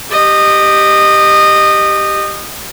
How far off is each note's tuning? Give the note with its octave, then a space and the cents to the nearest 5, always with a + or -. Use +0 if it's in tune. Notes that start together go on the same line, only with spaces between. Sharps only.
G4 +0 D#5 -20